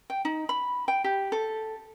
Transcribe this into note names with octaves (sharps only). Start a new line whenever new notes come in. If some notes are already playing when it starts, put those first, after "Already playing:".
G5
D#4
B5
G5
G4
A4